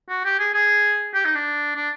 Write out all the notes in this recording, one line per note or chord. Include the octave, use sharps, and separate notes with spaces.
F#4
G4
G#4
G#4
G4
D#4
D4
D4